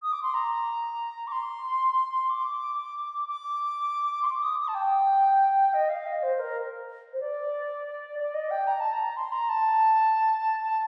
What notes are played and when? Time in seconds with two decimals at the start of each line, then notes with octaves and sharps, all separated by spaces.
0.02 D#6
0.12 D6
0.23 C6
0.34 A#5
1.27 D6
1.32 C6
2.30 D6
3.28 D6
4.23 C6
4.26 D6
4.43 D#6
4.59 D#6
4.68 A5
4.74 G5
5.74 D#5
5.89 F5
6.06 D#5
6.23 C5
6.39 A#4
7.13 C5
7.20 D5
8.19 D5
8.34 D#5
8.51 G5
8.67 A#5
8.80 A5
8.93 A#5
9.17 C6
9.32 A#5
9.49 A5
10.63 A5